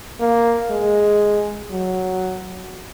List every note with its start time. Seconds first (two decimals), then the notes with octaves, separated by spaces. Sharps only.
0.20 A#3
0.70 G#3
1.71 F#3